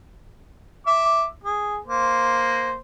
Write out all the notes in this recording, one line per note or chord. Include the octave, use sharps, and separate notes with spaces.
E5 D6
G#4
A#3 C5